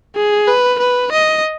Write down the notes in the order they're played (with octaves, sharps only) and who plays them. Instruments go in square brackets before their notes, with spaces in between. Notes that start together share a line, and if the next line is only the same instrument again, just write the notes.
[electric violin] G#4
B4
B4
D#5